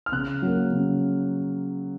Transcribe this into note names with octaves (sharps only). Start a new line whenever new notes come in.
F6
C#3 F#6
F#3 A#3
C#3